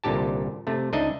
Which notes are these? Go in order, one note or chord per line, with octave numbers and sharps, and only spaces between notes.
C2 A#2 D3 G4 A5
C3 A3
C#2 D4 D#4 D#5 E5